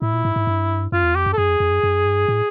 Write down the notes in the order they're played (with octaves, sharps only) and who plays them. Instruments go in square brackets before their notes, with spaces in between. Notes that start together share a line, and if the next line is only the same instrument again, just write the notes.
[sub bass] A2 [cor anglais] E4
[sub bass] A#2
G#2
G#2
G2
[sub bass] F#2 [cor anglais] F4
[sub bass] E2
[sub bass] F2 [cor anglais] G4
[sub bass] F#2
[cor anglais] A4
[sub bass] F#2 [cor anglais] G#4
[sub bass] F2
F2
F#2
F#2
G2
A2